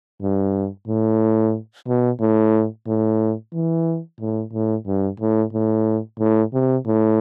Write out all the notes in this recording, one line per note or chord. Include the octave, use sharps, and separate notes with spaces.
G2
A2
B2
A2
A2
E3
A2
A2
G2
A2
A2
A2
C3
A2